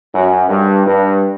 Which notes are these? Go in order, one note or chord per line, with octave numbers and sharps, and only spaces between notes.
F#2
G2
G2